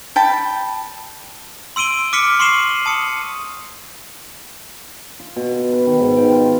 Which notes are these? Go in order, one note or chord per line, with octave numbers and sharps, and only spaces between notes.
G5 A5 B5
C6 E6 D7 D#7 G7
D6 F6 B6 C#7 G7
C6 C#6 C7 D#7 E7 F#7
A5 D#6 C#7
F4
B2
B4
B4
D#3
G#2
G5
F4